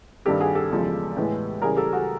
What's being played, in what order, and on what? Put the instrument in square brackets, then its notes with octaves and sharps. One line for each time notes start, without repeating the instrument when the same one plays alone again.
[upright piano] G2 D#3 G3 C4 G4 A4
F#4 G#4
G4 A4
E2 C#3 F3 G#3
A2 E3 G#3 B3
C#3 E3 G3 G#4 A#4
G4 A4
F#4 G#4